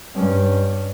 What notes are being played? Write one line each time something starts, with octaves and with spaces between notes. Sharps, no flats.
G2 C#4